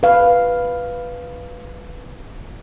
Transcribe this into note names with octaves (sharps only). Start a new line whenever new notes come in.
B4 F5